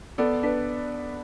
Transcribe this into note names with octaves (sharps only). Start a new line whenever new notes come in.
B3 A4 D5
D4 B4